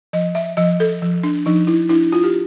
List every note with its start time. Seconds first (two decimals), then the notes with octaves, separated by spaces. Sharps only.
0.13 F3 D#5
0.35 E5
0.57 F3 D#5
0.80 A4
1.02 F3
1.23 D4
1.46 F3 D#4
1.67 E4
1.89 D4 E4
2.12 F4
2.24 G4